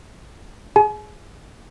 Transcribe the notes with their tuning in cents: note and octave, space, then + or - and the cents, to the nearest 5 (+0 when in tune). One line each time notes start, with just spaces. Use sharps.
G#4 +0 G#5 +40